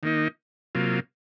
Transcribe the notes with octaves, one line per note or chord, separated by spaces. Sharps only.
D#3 A#3 D#4
C3 F#3 A#3 F4